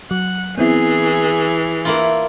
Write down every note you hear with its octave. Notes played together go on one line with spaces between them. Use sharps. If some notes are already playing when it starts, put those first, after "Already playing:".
F#3 F#5
E3 B3 C4 E4 G#4
A#3 E4 F4